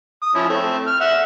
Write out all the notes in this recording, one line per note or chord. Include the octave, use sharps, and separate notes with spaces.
D#6
F3 C#4 E4
A3 C4
F6
E5 F#5